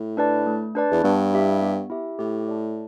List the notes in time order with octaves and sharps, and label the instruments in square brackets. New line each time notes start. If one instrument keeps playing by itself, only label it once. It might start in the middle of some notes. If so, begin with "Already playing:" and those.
Already playing: [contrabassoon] A2
[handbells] D4 B4 D5 A5
A3
D4 B4 D5 A5
[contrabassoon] E2
[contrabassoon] G2 [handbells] B3
[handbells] E4 G4 E5
B3
E4 G4 E5
[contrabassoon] A2 [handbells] G4
[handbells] D5 A5